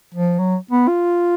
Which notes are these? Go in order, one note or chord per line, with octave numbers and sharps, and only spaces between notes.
F3
F#3
B3
F4